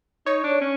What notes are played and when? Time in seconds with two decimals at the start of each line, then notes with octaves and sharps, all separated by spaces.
0.26 D#4 C#5
0.44 D4
0.61 C#4